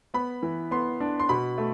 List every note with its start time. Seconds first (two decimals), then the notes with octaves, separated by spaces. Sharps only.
0.14 B3 B5
0.43 E3
0.71 B3 C6
1.00 D4
1.20 C6
1.29 B2 B5
1.58 A3